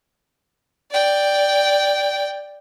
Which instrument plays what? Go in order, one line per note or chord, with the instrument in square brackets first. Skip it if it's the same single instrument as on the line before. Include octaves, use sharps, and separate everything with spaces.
[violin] D5 G5